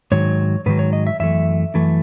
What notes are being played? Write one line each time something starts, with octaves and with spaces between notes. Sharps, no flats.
G#2 D#3 F#3 C#5
G#2 D#3 F#3 B4
C#5
D#5
E5
F#2 E3 A3 E5
F#2 E3 A3